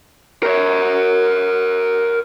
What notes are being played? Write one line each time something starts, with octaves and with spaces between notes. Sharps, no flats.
A#4 C#5